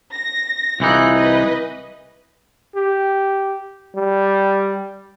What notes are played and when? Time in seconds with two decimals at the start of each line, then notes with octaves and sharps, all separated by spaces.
0.14 A#6
0.80 C2 E3 D#4 F4 F#6
1.14 B4 D#5
2.76 G4
3.96 G3